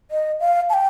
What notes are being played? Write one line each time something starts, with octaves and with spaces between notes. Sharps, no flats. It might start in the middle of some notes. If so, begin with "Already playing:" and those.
D#5
F5
A5
G5